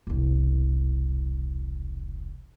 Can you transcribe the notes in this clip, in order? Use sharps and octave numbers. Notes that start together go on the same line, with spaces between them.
E1 C2